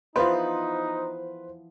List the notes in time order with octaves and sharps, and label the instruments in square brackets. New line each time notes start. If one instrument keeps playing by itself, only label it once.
[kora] E3 F3 B3 [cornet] D#4 [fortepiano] F4 B4 [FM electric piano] C5